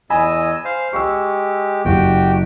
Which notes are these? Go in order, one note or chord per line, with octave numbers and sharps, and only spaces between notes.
E2 D#5 G#5 B5 E6
C5 F5
G#3 G4 C#6 E6
F#1 F#4 G4 G5